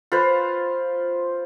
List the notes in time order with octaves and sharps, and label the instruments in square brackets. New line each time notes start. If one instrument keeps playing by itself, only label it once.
[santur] F4 B4 C5